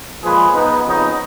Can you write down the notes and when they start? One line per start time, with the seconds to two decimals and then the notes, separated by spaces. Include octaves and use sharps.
0.23 A#2 F3 G#3 G#4 B4
0.54 B3 D#4
0.86 F2 C#3 F#3 B3 D#4